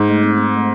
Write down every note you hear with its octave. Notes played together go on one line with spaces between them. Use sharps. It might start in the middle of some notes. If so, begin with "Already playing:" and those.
Already playing: G#2 D#4
A3
C4
C4
A3